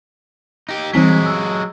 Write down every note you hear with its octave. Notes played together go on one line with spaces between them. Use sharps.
D#4 G4
E3 F#3 G#3 C4 B6
E6